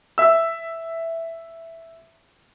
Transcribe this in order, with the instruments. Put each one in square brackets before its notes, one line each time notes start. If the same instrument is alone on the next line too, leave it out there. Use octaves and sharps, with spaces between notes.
[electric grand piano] E5 E6